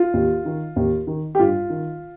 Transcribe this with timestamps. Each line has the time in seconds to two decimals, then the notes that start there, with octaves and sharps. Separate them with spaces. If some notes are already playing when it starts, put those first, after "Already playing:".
Already playing: F4
0.14 D#2
0.45 D#3
0.76 D#2
1.07 D#3
1.35 G4
1.39 G2 F4
1.70 D#3